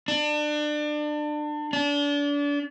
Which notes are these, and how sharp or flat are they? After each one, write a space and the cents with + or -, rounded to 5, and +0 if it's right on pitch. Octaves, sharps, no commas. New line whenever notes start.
D4 +30
D4 -30